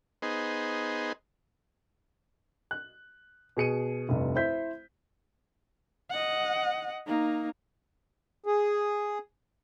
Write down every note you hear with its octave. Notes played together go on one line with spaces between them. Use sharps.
B3 D#4 G#4 C5
F#6
B2 G#4 C#7 D#7
F1 C2 G2
E4 C5 E5 G6 B6
D#5 F#5
A#3 D#4
G#4